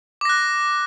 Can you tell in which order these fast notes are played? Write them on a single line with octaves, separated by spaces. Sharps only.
D6 A#6 F#6